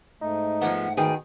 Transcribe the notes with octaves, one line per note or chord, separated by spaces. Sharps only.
G#2 A3 D#4
F3 G#3 B3 F#5
B2 D#3 G#4 G5